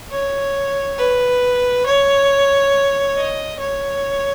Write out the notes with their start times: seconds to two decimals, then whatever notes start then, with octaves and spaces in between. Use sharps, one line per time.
0.12 C#5
0.98 B4
1.86 C#5
3.17 D#5
3.59 C#5